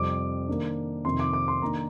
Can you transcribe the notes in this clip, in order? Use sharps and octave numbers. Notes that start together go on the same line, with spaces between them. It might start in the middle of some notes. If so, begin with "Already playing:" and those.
Already playing: F2 C3 G3 D6
D#3 A#3 D4
F2 C3 D#3 C6
D6
D6
C6
D#3 A#3 D4 A#5